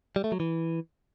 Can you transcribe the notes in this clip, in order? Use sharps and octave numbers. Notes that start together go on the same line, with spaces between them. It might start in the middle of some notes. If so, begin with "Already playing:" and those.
G3
A3
F#3
E3